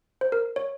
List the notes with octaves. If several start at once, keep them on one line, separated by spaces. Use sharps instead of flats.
C5
A#4
C#5